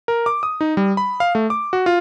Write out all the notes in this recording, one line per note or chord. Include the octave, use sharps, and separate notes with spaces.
A#4
D6
D#6
D#4
G3
B5
F5
A3
D6
F#4
F4